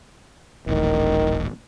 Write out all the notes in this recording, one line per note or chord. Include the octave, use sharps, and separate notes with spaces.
D#1 A1 A2 D#3